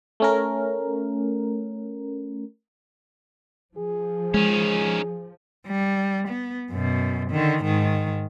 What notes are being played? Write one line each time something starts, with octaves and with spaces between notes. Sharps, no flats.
A3 C#4 A#4
F3 G#4
D#3 G#3 C#4
G3
B3
F#2 B2
D3 D#3
G#2 D#3